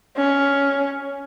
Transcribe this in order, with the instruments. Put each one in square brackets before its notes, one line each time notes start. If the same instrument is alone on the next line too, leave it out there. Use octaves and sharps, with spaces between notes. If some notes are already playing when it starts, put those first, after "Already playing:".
[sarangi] C#4